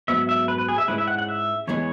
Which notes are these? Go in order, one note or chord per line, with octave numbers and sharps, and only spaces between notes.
G#2 F#3 B3 E5
E5
B4
B4
G#4
E5
G#2 G#3 C#4 E4 B4
E5
F#5
F#5
E5
E2 E3 G#3 B3 G#4 C#5